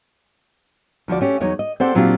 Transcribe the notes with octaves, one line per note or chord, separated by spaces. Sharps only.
D2 F3 F#4 D5
A3 C#4 G4
E2 F#3 D#4 C#5
D#5
C4 G4 A4 C5 D5 F#5
A#2 F#3 C4 D4 F4 G4